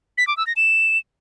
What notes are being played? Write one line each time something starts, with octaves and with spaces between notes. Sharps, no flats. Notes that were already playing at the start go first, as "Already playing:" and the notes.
B6
D6
E6
A#6
E7